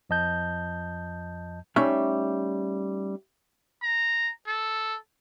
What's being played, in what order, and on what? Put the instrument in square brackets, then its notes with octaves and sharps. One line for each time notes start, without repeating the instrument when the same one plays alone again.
[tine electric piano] F2 F3 D#5 A5 G6
[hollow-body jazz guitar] G3 A3 C#4 D#4 E5
[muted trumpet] A#5
A4